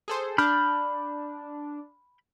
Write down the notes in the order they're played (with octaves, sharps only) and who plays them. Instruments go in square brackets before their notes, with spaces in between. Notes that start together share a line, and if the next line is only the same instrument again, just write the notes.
[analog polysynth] G#4 A4 C5
[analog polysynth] D4 [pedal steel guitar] B5 F6 G6